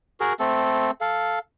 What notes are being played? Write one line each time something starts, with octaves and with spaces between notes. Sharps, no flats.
F#4 G#4 A#4
A3 C4 A4
A4 F5